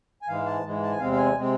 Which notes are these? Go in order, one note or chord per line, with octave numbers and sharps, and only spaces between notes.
G#5
G#2 E3 G#3 F5
A5
G#2 E3 G#3
A5
G#5
E2 C3 G#3 C4 F5
F5
G#5
C3 G#3 C4